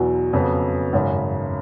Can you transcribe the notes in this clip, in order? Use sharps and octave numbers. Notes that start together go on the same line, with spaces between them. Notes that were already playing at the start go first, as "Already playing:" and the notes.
Already playing: E2 B2 F#3
F2 C#3 F#3 B3
G#1 F#2 C#3